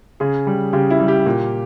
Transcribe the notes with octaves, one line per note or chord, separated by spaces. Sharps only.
C#3 G#4
G3
C#3 G4
E4
G3
G4
A#2